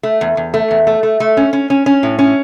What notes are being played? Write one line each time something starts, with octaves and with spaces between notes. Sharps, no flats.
A3
E2
E2
A3
E2
A3
A3
A3
C#4
C#4
C#4
C#4
A2
C#4